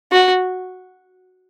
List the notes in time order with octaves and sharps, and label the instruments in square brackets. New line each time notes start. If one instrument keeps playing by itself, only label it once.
[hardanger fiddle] F#4